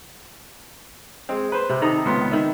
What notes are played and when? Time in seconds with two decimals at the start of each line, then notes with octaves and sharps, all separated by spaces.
1.29 G#3 C4
1.52 B4 C5
1.69 C3
1.82 D#3 A4 A#5 D#6
2.05 C#2 B3 C6
2.31 D#3 E5